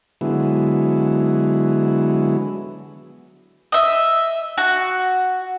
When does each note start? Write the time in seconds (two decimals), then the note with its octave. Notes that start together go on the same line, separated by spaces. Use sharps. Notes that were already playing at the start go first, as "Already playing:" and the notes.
0.21 D3 F#3 G#3 B3 E4
3.72 D#5 E5
4.58 F#4